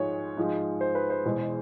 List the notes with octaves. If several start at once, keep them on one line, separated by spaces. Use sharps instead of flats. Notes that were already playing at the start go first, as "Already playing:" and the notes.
Already playing: G#2 F3 G#3 C#5
G#2 F3 G#3
C5
B4
C5
E2 B2 G#3